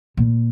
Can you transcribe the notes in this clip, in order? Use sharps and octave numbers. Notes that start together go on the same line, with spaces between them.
A#2